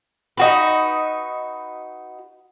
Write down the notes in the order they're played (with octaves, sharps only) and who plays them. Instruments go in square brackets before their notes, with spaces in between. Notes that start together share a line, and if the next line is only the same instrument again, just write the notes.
[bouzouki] D#4 F#4 B4